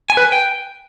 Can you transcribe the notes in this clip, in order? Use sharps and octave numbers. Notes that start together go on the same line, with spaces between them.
G#5
B4
G#5
G5